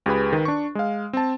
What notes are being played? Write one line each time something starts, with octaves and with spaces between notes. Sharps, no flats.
C#2 G4 G#4 B4 B5
D#3 B4
D4 C#6
G#3 F5
C4 A5